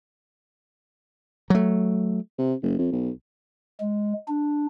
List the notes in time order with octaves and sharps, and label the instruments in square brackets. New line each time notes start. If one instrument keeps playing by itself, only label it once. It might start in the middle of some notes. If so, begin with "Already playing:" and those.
[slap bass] F#3 A3
[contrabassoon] C3
F#1
F2
B1
[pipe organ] G#3
D4